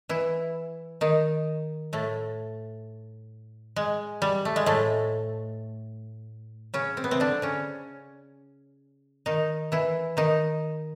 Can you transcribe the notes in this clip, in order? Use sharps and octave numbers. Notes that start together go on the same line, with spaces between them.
E3 E4
D#3 D#4
A2 A3
G#3
G3
A3
G#3
A2 A3
C#3 C#4
C4
B3
C3 C4
D3 D4
C#3 C#4
D#3 D#4
E3 E4
D#3 D#4